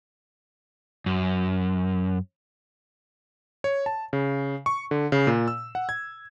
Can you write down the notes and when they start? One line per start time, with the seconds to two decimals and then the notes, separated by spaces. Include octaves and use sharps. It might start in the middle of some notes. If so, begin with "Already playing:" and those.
1.06 F#2
3.64 C#5
3.86 A5
4.13 C#3
4.66 C#6
4.91 D3
5.12 C#3
5.27 A#2
5.48 E6
5.75 F#5
5.89 G#6